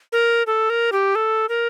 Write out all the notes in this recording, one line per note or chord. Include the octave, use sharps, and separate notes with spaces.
A#4
A4
A#4
G4
A4
A#4